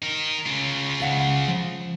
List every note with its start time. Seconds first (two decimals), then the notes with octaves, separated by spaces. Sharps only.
0.02 D#4 A#4
0.46 C#3 F4
1.00 C#2 F5 F#5
1.48 F3